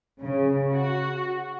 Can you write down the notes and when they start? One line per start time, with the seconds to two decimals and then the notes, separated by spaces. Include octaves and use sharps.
0.21 C#3
0.73 F#4